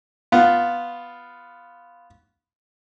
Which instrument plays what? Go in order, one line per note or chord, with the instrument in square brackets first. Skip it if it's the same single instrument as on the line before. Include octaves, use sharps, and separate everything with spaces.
[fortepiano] B3 F4